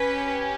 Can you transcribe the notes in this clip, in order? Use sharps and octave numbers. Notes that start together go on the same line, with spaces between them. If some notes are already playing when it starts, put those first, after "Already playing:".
Already playing: C#4 G4 B4